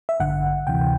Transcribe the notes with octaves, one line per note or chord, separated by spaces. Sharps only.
E5
A1 G2 D3 F#5
D2 C3 E3 G5